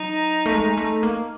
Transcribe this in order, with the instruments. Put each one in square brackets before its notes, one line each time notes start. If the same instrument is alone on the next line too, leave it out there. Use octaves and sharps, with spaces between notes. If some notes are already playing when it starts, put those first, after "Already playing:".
Already playing: [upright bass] F#3 [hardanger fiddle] D#4
[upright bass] A3
G#3
A3
A#3